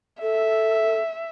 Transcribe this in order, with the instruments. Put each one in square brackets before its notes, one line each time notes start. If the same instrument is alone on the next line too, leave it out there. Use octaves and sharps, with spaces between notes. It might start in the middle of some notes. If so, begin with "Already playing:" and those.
[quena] A4 [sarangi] E5